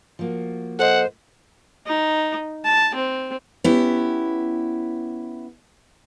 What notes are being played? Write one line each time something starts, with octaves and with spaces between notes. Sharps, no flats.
F3 A#3 F#4
A4 C5 D#5 F#5
D#4
A5
C4
B3 C#4 E4 G4